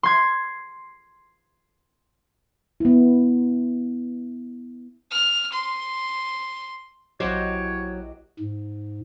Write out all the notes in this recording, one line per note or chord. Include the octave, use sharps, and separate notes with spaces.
C6 G#6
B3 E4
F6
C6
A#1 F#3 E4 F#4 G4 C5 C#5 D#5
G#2